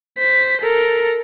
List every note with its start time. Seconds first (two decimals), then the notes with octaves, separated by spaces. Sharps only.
0.19 C5 B6
0.62 A4 A#4